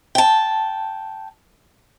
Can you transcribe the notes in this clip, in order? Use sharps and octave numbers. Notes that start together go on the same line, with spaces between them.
G5 A5